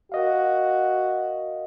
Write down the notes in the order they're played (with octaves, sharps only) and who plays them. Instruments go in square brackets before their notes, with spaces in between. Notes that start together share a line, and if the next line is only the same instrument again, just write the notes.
[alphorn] F#4 [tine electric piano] A#4 D#5 F5